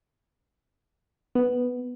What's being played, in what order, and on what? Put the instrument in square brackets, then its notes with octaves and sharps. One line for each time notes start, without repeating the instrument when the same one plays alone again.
[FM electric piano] B3